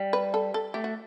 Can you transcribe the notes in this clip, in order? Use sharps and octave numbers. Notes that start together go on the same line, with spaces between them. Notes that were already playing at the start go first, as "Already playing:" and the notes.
Already playing: G3
B4
A4
A4
A3 G4
F#4